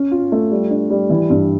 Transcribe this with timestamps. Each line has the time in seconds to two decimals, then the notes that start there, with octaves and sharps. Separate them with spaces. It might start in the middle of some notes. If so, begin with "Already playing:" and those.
Already playing: C#4
0.11 F4
0.32 A3
0.51 G3
0.70 D4
0.90 G3
1.10 E3
1.30 G2